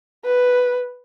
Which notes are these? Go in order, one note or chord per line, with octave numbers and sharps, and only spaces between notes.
B4